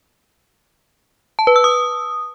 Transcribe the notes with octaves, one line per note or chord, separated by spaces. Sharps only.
A5
B4
E6
D#6